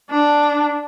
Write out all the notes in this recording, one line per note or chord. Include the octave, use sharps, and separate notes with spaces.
D4